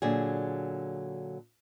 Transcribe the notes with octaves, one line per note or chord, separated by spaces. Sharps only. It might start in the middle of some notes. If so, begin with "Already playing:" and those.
A#2 D3 F#3 G#4